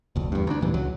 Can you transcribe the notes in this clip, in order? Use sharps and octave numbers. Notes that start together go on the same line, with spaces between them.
F1 D2
E2 G2
D2 D4
E1 G2 A#2 E3
C#2 F#3